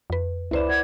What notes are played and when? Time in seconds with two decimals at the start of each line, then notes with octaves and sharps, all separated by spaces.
0.10 F2 B4
0.51 C#2 E4 B4 C5 D5 E7
0.69 B4 D5 F#5 G#6